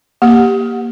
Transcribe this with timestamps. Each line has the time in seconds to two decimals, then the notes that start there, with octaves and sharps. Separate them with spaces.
0.22 A#3 G4